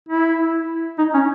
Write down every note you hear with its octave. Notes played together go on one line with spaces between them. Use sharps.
E4
D#4
C#4